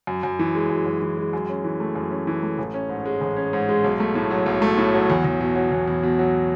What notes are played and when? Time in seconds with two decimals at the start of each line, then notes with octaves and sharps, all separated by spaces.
0.07 F#2
0.23 F#2
0.39 E3
0.55 G#3
0.70 F#2
0.86 F#2
1.02 E3
1.17 G#3
1.33 F#2
1.49 C#4
1.64 E3
1.80 A3
1.95 F#2
2.11 C#4
2.27 E3
2.43 A3
2.58 A1
2.74 C#4
2.89 G#2
3.06 G#3
3.21 A1
3.37 C#4
3.53 G#2
3.69 G#3
3.84 B1
4.00 A3
4.15 A2
4.30 F#3
4.46 B1
4.62 A3
4.77 A2
4.94 F#3
5.10 E2
5.25 E2
5.41 B2
5.56 F#3
5.72 E2
5.88 E2
6.03 B2
6.19 F#3